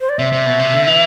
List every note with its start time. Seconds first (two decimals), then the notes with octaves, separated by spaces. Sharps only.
0.01 C5
0.09 D5
0.19 C3 E5
0.32 C3
0.46 B2
0.59 C3
0.73 D3
0.87 E3